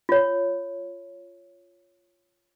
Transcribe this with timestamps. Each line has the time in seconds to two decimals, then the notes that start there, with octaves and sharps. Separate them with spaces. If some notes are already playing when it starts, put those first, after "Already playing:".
0.09 F4 C#5